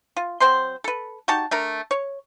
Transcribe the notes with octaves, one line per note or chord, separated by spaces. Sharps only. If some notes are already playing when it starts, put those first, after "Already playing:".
F4
F#3 C4 C5 C6
A4 B4
D#4 F#4 G4 A5
A3 D4 A#4
C#5